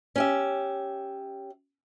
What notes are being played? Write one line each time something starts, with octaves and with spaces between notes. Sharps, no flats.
C#4 G4 E5